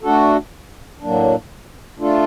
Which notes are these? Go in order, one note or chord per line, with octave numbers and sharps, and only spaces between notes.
A3 D4 F#4 A4
A2 F#3 A#3 D4
A3 D4 F4 A4